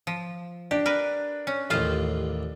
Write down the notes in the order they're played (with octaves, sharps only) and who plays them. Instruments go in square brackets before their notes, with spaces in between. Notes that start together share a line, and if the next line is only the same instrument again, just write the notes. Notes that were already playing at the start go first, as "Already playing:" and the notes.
[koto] F3
[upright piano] D4 [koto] G4
[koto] A#4 B4
C#4
[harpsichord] A1 D#2 [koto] F4 C5 F5